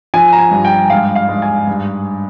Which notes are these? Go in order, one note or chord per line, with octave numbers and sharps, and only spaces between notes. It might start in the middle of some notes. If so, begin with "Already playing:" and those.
F3 G#5
A#5
G#5
G2
G5
G#2 F5
F5
G#2
G#5
G2